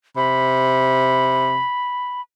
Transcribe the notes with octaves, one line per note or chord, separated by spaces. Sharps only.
C3 B5